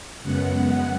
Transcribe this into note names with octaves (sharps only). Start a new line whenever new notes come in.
F#2 C#3 G#3 B3 F#5